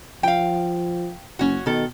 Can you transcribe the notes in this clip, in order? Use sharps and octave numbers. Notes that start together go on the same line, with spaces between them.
F3 F5 G5
F#1 C#4 F#4
B2 D#3 A4